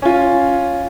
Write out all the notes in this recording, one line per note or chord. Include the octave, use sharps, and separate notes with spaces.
C#4 F4